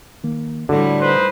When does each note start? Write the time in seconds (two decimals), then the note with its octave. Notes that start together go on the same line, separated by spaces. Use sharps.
0.24 D#3 A#3
0.69 A2 D3 G3 F#4 D5
1.00 D#4 B4 C5